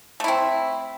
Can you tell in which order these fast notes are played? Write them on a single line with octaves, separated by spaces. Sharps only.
A3 E4 C4